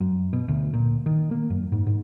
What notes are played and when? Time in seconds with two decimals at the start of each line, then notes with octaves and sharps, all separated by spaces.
0.01 F#2
0.33 B2
0.48 D2
0.74 A#2
1.06 D#3
1.31 A#3
1.50 F#2
1.72 G#2
1.87 G#2